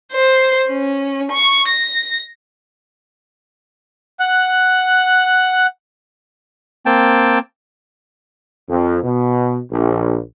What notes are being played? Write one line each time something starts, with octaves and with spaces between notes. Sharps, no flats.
C5
C#4
C#6
A#6
F#5 F#6
A#3 C4 G5 A5
F2
B2
A#1